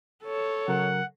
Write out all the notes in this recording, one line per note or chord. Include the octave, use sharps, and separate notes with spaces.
A4 C#5
C#3 F#3 A#4 F#5